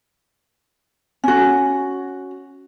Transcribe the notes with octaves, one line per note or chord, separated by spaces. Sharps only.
C#4 F#4